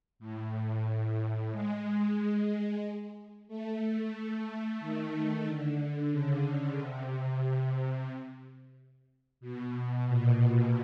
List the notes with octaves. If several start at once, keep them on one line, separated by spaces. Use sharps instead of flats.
A2
G#3
A3
A3
A3
D#3
D3
C#3
C3
B2
A#2